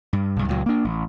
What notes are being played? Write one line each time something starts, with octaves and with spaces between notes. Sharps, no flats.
G2
B1 G2
C#2 A#2 D3 F#3
A#3 D4
A1